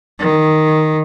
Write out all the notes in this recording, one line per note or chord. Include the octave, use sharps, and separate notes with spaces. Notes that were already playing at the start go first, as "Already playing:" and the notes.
D#3